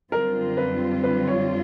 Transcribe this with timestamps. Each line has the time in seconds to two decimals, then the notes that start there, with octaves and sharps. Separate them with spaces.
0.11 F#2 D3 G3 C4 F4 A#4
0.57 B4
1.04 B4
1.28 C#5